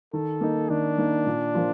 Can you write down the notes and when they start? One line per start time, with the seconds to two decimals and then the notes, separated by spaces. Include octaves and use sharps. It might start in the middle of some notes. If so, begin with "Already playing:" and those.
0.13 D#3 A4
0.41 A#3 D#4
0.70 D#3 D4
0.98 A#3 D#4
1.27 A#2
1.55 F3 A#3 F4